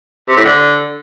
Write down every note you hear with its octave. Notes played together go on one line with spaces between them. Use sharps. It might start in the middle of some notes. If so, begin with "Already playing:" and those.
C3
A2
D3